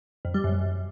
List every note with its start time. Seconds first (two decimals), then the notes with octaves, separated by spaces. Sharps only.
0.25 F2
0.34 G3
0.44 F#2